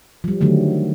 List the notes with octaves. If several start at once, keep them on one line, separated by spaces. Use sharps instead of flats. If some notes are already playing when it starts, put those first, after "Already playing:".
F3 G3
D3 D#3 F#3 A3